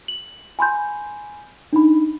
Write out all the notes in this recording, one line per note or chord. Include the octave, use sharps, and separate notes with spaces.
F#7
G#5 B5 C6 G6
D4 D#4 B5